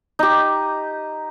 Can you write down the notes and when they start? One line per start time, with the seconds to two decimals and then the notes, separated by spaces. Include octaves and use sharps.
0.19 D#4 G4